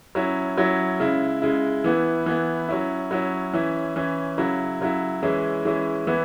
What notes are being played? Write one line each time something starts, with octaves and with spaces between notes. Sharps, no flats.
F#3 C#4 E4
F#3 C#4 E4
C#3 G#3 E4
C#3 G#3 E4
E3 B3 E4
E3 B3 E4
F#3 C#4 E4
F#3 C#4 E4
E3 C#4 E4
E3 C#4 E4
C#3 F#3 E4
C#3 F#3 E4
E3 G#3 C#4 E4
E3 G#3 C#4 E4
E3 B3 E4